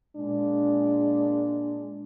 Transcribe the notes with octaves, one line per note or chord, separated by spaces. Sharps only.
A#2 G#3 D4